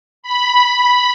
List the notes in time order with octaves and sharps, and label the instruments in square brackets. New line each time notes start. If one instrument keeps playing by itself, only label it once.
[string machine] B5